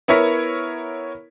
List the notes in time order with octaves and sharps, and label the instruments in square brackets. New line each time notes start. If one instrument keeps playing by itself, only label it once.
[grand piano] B3 E4 A#4 C#5 B6